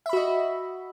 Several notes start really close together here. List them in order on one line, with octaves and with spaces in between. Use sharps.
E5 B5 F#4 D#5